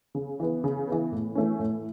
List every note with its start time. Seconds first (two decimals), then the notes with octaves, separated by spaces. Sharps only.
0.15 C#3
0.40 E3 B3
0.64 C#3
0.87 E3 B3
1.12 A2
1.35 E3 A3 C#4
1.59 A2